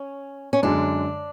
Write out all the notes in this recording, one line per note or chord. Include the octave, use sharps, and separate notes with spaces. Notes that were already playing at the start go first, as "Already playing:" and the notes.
Already playing: C#4
C#4
F#2 D3 G#3 D4